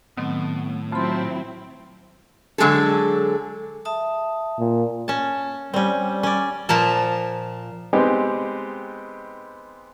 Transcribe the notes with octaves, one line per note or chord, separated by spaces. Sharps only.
A2 D#3 F#3 B3 C4
F#3 C4 E4 F4 A5 B5 C6
D3 F#3 G#3 G#4 A4
E5 A5 D#6
A#2
C#4 A5
G3 C4 C#4
G3
C#4 D5
A#2 F3 A#4 A5
G#3 B3 C4 D#4 G4